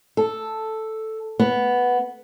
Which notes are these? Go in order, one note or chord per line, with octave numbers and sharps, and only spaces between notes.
A4
B3